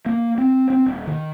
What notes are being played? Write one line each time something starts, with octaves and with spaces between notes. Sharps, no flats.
A#3
C4
C4
D#1
D#3